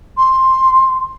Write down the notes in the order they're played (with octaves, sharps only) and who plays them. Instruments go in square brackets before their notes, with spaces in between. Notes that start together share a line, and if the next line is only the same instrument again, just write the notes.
[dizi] C6